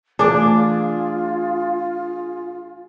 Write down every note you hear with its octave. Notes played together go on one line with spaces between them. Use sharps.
E3 A3 D4 F4 G#4 D5